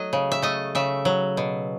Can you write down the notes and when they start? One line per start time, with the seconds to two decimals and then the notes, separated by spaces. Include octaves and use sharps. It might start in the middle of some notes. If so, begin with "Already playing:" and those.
Already playing: F#3 A3 D#5
0.13 C#3
0.32 E5
0.42 A3 D#5
0.75 C#3 E5
1.05 F#3
1.37 B2